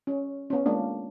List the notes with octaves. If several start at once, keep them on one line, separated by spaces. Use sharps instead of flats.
C#4
B3 C#4
G#3 A#3 D4